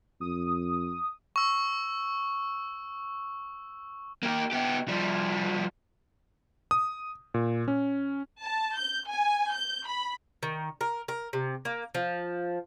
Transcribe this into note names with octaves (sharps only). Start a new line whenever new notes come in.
F2 D#6
C#6 E6
A#3 G4
B3 G4
F3 G3
D#6
A#2
C#4
A5
G6
G#5
G6
B5
D#3
A#4
A#4
C3
A#3
F3